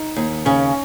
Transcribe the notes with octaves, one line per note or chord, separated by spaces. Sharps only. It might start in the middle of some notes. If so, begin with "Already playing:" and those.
Already playing: D#4
D#2
C#3 C#4